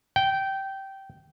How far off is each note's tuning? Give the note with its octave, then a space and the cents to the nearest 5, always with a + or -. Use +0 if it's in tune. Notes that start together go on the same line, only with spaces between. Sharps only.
G5 -15